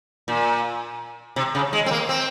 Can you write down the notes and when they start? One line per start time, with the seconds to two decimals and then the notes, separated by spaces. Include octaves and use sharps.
0.28 A#2
1.36 C3
1.55 C#3
1.73 G#3
1.86 C4
1.91 A#3
2.09 C4